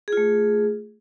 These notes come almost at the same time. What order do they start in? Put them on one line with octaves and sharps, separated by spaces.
G#4 F4 A3